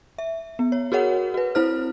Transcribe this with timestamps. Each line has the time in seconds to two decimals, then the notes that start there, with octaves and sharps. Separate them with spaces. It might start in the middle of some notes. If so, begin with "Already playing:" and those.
0.18 E5
0.59 B3
0.72 C#5
0.92 F#4 G#4 A#4 C#5 F#5
1.34 F#4 B4
1.55 C4 E4 C5 F6